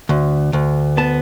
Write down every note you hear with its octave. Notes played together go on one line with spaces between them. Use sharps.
D2
D2
B3 A5